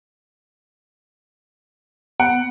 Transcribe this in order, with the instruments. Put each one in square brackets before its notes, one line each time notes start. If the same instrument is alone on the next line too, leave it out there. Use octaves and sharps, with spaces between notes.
[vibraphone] B3 [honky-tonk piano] F#5